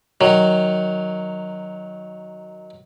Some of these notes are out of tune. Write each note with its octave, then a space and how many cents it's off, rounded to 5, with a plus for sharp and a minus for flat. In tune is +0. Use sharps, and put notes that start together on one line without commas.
D#3 +0 F#3 +0